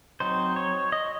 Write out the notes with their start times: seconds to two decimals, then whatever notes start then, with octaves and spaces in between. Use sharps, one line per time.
0.20 F#3 C4 D#4 C5
0.56 C#5
0.92 D#5